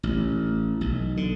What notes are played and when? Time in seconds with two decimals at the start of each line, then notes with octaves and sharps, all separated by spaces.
0.03 A1
0.81 B1
1.17 D3